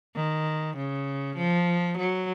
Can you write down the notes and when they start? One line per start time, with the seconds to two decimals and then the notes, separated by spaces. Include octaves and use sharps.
0.16 D#3
0.77 C#3
1.37 F3
1.98 F#3